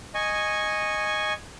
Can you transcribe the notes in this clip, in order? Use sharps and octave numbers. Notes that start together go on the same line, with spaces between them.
D#5 G#5 C#6